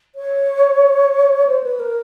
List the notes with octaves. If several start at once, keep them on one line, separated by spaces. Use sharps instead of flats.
C#5
C5
B4
A#4